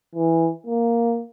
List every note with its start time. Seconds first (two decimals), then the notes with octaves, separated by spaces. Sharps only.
0.15 E3
0.67 A#3